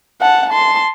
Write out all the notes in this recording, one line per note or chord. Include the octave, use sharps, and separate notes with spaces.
F#5 A5
A5 C6